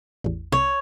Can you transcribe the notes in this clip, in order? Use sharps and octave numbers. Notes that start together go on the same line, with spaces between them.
A1 E2
C2 C#5